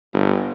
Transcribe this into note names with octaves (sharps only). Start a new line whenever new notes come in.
G1